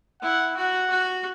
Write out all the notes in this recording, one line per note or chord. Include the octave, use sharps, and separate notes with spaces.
E4 F#5
F#4 F#5
F#4